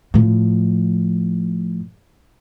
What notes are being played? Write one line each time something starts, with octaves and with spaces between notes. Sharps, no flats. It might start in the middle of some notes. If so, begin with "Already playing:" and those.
A2 F3